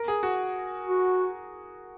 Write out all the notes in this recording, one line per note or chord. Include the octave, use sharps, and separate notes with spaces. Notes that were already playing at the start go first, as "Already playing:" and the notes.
Already playing: A#4
G#4
F#4
F#4